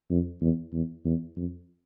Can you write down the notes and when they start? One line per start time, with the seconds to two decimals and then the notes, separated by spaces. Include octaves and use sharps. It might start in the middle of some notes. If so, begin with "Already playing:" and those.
0.10 F2
0.41 E2
0.73 E2
1.04 E2
1.36 F2